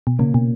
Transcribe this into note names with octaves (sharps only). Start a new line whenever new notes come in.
B2
A#2 C#3 A#3 C#4
B2